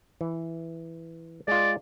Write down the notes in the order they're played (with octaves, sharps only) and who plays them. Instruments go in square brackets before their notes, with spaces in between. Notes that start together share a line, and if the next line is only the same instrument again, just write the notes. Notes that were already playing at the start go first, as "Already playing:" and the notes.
[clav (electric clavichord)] E3
[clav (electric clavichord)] G#3 F4 [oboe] D5